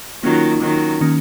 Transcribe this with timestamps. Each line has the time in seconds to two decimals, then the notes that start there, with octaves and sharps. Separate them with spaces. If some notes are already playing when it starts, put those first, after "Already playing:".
0.23 D#3 F#3 A#3 C#4 F4
0.62 D#3 F#3
1.01 D#3 A#3 C#4